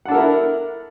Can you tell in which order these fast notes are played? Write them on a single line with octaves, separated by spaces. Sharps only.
F#5 D4 A4 A#4 E4